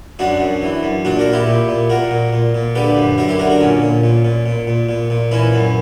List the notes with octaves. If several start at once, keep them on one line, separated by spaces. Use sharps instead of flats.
F#2 D4 F#4
F#2
E3
F#2
A#2 D4 F#4
F#4 A#4
A#2
E4 G4
A#2
A#2
A#2 F#4 A#4
A#2
A#2
A#2
D3 G4 B4
F#2
F#2 F#4 A#4
E4 G4
D3 F#4 A#4
F#4 A#4
A#2 C#4
A#2
A#2
A#2
A#2
A#2
A#2
A#2
E3 C#4 E4
F#2